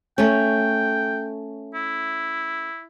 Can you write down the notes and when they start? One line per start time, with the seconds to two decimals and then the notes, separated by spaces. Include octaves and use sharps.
0.18 A3 C#4 G5
1.75 E4